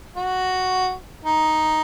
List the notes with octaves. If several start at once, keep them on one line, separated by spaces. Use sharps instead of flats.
F#4
D#4